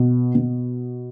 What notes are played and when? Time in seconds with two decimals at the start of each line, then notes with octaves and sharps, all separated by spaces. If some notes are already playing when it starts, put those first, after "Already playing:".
Already playing: B2
0.35 B2